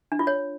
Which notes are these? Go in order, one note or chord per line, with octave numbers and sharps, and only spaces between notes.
D4
F4
C#5